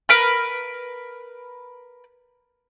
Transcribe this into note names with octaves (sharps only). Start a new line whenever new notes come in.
A#4 B4 F6